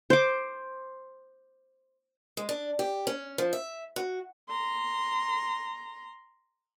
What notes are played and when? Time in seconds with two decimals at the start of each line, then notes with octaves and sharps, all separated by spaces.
0.10 C5 D6
2.37 G#3
2.49 D4
2.79 G4
3.07 C#4
3.38 F3
3.53 E5
3.96 F#4
4.49 A#5 C6